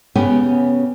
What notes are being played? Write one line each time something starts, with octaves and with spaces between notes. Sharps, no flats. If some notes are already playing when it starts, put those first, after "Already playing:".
C#3 B3 C#4 G4